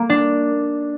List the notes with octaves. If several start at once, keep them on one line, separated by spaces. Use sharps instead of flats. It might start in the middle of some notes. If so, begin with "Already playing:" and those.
Already playing: A#3
D4